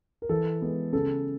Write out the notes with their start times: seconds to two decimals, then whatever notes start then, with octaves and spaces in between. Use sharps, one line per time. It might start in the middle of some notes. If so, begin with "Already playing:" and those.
0.22 A#4
0.29 E3 A4
0.62 G#3 B3
0.93 C#3 A4